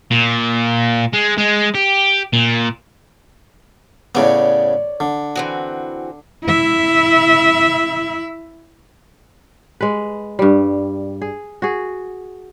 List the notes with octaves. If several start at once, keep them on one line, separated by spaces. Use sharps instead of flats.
A#2
G#3
G#3
G4
A#2
A2 C#3 B3 C#5 D5
D3
E3 C4 F#4
E4 E5
G#3 B4
G2 G3
G#4
F#4 G#4